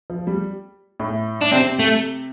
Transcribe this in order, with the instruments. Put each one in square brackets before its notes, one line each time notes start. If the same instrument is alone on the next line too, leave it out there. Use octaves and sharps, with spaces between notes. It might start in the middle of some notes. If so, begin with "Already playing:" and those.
[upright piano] F3
G3
A2
[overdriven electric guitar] D4
[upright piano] C3 [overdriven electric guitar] C4
[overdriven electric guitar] A3